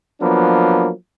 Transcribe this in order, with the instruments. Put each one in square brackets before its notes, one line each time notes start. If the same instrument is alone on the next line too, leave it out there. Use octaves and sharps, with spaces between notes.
[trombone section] F3 F#3 A#3 B3 D4